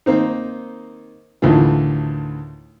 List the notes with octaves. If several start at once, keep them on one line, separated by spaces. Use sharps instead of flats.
D#3 A#3 C4 D#4
D2 A2 D#3 E3 F4